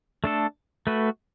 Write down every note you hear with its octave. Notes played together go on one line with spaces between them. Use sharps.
A3 D4 A4
A3 F#4 B4